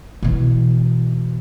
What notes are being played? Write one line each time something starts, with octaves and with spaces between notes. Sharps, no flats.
B2 E3